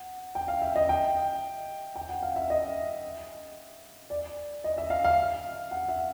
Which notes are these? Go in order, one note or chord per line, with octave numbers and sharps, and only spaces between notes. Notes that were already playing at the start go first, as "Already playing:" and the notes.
Already playing: F#5
G5
F5
E5
D#5
G5
G5
F#5
F5
E5
D#5
D5
D#5
E5
F5
F5
F#5
E5